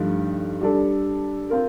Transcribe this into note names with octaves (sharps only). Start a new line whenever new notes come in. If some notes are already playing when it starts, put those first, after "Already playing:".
Already playing: G2 F3 A3 D#4
G3 D4 A4
C4 F4 A#4